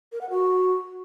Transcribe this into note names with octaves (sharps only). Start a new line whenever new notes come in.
A#4
F#5
F#4